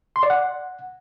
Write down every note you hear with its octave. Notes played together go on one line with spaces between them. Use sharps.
C6
D5
F#5